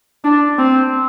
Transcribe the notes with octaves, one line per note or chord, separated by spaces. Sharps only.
D4
C4